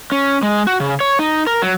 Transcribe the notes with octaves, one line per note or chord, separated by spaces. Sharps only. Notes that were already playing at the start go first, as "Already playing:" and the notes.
C#4
G#3
F#4
C#3
C#5
D#4
A#4
F#3